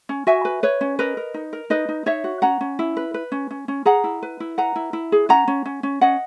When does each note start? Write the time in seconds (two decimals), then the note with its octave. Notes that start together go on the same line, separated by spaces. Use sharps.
0.09 C#4
0.27 F#4 E5 G#5
0.45 B4
0.63 B4 C#5
0.81 C#4
0.99 A#4 B4 D#5
1.17 A#4
1.34 D#4
1.53 A#4
1.70 D#4 B4 D#5
1.89 D#4
2.06 D#4 C#5 E5
2.24 F#4
2.42 C#4 F#5 A#5
2.61 C#4
2.79 E4
2.97 B4
3.14 B4
3.32 C#4
3.51 C#4
3.68 C#4
3.85 G#4 F#5 A#5
4.04 E4
4.23 B4
4.40 E4
4.58 B4 F#5 A#5
4.76 E4
4.93 E4
5.12 G#4
5.29 C#4 F#5 A#5
5.48 C#4
5.65 C#4
5.83 C#4
6.01 C#4 D#5 F#5